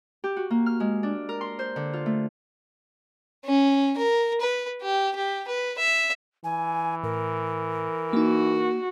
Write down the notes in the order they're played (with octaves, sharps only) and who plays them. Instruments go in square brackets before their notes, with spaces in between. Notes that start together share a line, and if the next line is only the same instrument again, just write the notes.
[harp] G4
F#4
A#3
F6
G#3
D4
A#4
C6
C5
D3
F4
A3
[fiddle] C#4
A#4
B4
G4
G4
B4
E5
[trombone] E3 [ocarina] G#5
[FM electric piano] A2 [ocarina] A#4
[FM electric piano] A#3 D#4 [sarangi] F#4